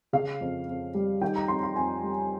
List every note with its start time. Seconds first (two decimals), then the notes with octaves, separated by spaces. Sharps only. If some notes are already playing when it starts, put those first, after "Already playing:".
0.13 C#3 F5
0.41 F2
0.68 F2
0.94 G3
1.21 D#3 G5
1.36 A#5
1.48 F2 C6
1.63 C6
1.76 F2 G#5
2.03 G3